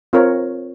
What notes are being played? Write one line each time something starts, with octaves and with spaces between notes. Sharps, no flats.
C4 F4 A#4 C#5